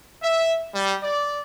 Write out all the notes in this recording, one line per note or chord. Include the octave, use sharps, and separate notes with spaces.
E5
G3
D5